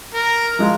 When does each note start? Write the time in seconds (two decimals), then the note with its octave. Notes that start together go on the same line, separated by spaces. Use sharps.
0.15 A#4
0.59 F3 G#3 F4